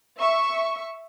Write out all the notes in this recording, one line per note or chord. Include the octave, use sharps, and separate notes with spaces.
E5 C#6